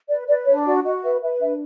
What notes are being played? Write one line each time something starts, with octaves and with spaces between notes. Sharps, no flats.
B4 D5
B4 D5
D4 C#5
F#4 D5
F#4 D#5
B4 E5
B4 E5
D4 E5